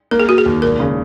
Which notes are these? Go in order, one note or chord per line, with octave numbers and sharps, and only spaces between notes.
A#3 A#4
G#4
A#3 F#4
G#4
D#2
E1 A#4
C#3